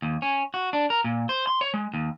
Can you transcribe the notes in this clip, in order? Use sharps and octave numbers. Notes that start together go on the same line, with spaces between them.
D#2
C#4
F#4
D4
A#4
A#2
C5
C6
C#5
G#3
D#2